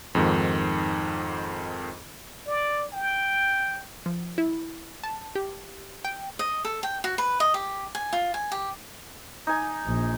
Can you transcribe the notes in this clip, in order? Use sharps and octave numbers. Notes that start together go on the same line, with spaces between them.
F2 G#2 D#3
D5
G5
F3
E4
A5
G4
G5
D#5
A4
G5
F#4
B4
D#5
G4
G#5
F4
G#5
G4
D#4 G#5
A#1